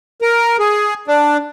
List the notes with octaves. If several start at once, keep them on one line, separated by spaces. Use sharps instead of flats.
A#4
G#4
D4